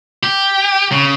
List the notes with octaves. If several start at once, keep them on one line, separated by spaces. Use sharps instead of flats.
G4
C#3